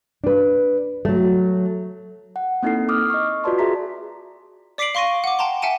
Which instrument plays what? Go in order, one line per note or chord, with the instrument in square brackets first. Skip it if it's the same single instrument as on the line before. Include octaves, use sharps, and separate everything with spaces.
[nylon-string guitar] D4 B4
F#3 A3
[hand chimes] F#5
A#3 C4 D#4 E4 A4 C7
D6 D#6 F6
D#5 C#6
F4 F#4 B4 D5 A5 C6
G#4 E5 A#5 B6
[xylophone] D5 D6 B6 C7 D7 F#7
F5 C6 C#6 A#6 D#7
F#5 D6
G5 A5 A#5 C6
E5 F#5 G#5 A5 D7 D#7